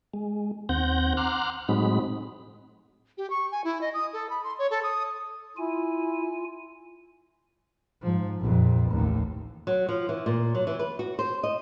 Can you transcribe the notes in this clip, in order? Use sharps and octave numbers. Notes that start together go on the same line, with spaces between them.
G#3
D#2 C4 F#5 G6 A#6
F#5 A#5 C6 D6 F6 F#6
A2 F#3 G#3 C4 D#4 B5
G4
C#6
G#5
E4
D#5
D#6
A4
B5
C6
C#5
A4
D#6
E4 F4 G#5
G#2 F3
A#1 F2
A1 D#2
F#3
F3
E3
A#2
F#3
E3
B4
F#4
C5
D#5